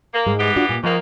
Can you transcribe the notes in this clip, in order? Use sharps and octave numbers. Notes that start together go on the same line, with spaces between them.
A#3
G#2 G#3
E3 B3 G4
D4 F4 F#4
A#2
G#2 D#3 F3 A#3